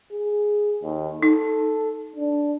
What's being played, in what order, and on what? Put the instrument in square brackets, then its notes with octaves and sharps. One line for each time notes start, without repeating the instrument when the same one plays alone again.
[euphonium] G#4
D#2
[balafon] D#4 [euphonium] A4
[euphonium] D4